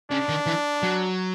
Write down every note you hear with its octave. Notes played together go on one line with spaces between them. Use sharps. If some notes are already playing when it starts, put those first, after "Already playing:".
C#3 D4
D#3
E3
F#3